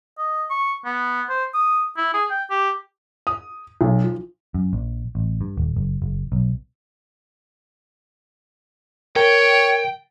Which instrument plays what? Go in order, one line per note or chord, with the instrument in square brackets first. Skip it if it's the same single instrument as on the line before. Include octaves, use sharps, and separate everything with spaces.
[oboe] D#5
C#6
B3
C5
D#6
E4
G#4
G5
G4
[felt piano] D#6
B1
F3
[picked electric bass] F#2
A#1
A1
G2
D#1
F#1
F#1
B1
[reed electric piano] A#4 [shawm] C#5 [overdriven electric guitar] G5